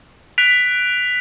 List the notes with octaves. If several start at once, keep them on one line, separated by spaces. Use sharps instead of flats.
F#6 B6 D7 F7